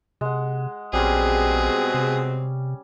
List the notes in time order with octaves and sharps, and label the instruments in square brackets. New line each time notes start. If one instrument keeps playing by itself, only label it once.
[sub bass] C3 [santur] G#3 F#5
[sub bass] A#1 [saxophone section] B2 G#3 C4 [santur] G3 C#4 [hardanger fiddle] G#4
[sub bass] C3